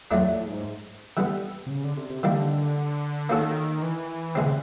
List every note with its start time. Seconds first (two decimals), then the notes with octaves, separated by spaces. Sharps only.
0.11 E2 F#3 A3 D4
0.23 A#2
0.35 A2
0.46 G#2
1.17 D3 G3 B3
1.67 C3
1.70 C#3
1.84 D3
1.97 C3
2.10 C3
2.23 D3 D#3 G3 A#3
3.29 D#3 A#3 C#4 F#4 A4
3.82 E3
4.35 B2 D3 G#3 C4
4.44 C#3